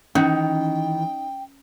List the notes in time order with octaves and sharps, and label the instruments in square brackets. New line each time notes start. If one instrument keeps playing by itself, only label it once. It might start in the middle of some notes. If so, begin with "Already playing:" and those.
[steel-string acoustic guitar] D#3 E3 [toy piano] C#4 [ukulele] D#4 [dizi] G5